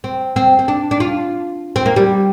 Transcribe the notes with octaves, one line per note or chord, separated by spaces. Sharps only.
C4
C4
C4
D4
D4
F4
C4
A#3
G3